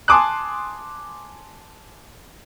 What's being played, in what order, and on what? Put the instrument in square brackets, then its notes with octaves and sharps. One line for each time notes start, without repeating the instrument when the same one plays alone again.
[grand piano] G#5 A5 C6 D6 D#6 F#6